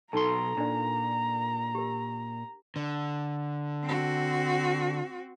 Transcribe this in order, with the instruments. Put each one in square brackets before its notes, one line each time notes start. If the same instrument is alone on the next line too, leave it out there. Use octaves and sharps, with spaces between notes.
[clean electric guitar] B1 C6 [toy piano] D#4 A4 A5 [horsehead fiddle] A#5
[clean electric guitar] A#2 [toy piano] D4 D5
[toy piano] G4 A#4
[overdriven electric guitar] D3
[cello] C4 F#4